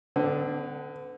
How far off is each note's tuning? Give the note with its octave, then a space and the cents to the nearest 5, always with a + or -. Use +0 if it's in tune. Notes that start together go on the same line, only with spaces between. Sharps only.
D3 +0 B3 +45